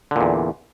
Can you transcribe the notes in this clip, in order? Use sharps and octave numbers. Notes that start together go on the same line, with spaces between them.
E2 A#2 D3